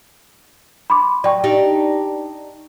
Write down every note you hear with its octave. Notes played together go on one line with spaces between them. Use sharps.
B5 C6 D6
F#3 D5 G5 C#6
D4 D#4 G4